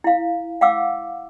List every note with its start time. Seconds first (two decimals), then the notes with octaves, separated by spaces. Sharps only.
0.04 E4 F5
0.61 F5 F#5 D6 E6